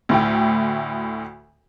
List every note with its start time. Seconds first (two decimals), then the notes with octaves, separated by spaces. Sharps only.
0.09 D2 A2 G5